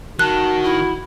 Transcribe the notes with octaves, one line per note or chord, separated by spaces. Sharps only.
D#3 F#4 A5 F#6
E4